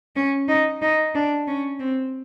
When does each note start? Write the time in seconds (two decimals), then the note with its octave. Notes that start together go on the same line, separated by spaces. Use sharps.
0.16 C#4
0.48 D#4
0.82 D#4
1.15 D4
1.47 C#4
1.79 C4